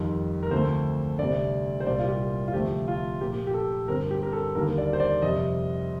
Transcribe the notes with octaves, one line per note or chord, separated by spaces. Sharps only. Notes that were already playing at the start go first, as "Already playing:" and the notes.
Already playing: F2 D#3 G3
A#4
D2 D3 F3 A3 C4 C5
D2 C3 G3 C4 D5
C5
C2 A#2 G3 A#3 D5
F4
G4
F4
D2 C3 F3 A3 C4 G4
F4
A#2 F3 A#3 G4
G4
A4
G2 D3 G3 C4 A#4
G4
A#4
A4
D#2 D3 G3 A#3 A#4
D5
C5
D5
F2 C3 G3 C4 D#5